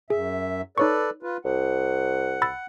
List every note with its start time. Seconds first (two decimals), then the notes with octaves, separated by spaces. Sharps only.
0.10 F#2 G#4 E5
0.78 D#4 A4 B4 C#5 D5 C#6
1.23 F4 B4
1.45 C2 F#5
2.42 B5 E6 A6